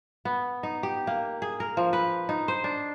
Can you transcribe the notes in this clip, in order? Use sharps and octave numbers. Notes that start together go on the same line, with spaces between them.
B3
D#4
G4
A#3
G#4
A#4
F3
B4
D#4
C5
D4